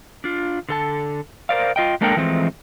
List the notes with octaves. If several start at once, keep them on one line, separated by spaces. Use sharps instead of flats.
D4 F4
D3 A4 A5
A#4 C5 D5 F5
F4 D#5 G5
G#3 A#3 D4 A4 A#4 G5
E3 F3 G#3 A3 C4